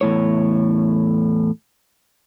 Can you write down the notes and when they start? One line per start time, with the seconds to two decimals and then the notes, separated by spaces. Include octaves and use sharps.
0.01 E2 A2 C#5